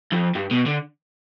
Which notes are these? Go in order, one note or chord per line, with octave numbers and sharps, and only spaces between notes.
F2
G2
B2
D3